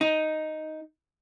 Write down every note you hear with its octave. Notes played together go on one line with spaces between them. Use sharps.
D#4